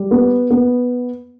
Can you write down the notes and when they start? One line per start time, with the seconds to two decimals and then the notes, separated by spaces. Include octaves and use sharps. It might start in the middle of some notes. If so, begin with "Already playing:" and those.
Already playing: G3
0.11 B3
0.50 B3